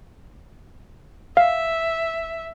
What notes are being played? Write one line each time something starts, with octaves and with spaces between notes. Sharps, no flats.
E5 F5